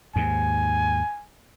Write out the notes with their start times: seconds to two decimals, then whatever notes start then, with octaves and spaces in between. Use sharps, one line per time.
0.16 D#2 G#2 G#5